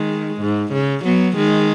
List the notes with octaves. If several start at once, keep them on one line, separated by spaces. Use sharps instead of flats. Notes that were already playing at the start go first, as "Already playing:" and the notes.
Already playing: D#3 G#3
G#2
C#3
F#3 B3
D#3 G#3